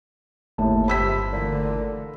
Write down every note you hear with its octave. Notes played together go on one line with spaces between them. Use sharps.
G1 D#2 A2 A5
G#1 C#2 G2 C3 B5 E6 B6
A#2 D3 E3 A3